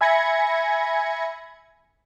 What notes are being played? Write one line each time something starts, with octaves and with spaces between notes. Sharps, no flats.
E5 G#5 B5 G#6 A#6 C#7